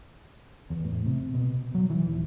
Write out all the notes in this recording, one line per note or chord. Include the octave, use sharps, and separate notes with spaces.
E2
A2
C3
B2
F#3
E3
D#1